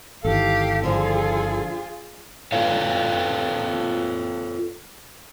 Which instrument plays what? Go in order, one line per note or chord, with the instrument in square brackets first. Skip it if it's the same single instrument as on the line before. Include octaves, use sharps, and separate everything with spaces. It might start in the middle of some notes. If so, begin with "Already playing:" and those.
[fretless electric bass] G1 D#3 E3 [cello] G4 F5 [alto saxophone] A4
[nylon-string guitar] D3 F3 [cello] F4 G#4
[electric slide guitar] F4 A4 B4 C#5 F5